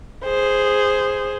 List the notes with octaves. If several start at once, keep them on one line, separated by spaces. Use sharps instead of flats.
G#4 C5